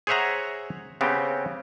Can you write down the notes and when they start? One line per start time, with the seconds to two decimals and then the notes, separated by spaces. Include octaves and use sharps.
0.07 G#4 C5 C#5 E5 F#5 A#5
1.01 C#3 B3 C4 G4